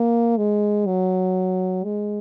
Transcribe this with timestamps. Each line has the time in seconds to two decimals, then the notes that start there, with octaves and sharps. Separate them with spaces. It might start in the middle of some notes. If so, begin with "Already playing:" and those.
Already playing: A#3
0.37 G#3
0.86 F#3
1.84 G#3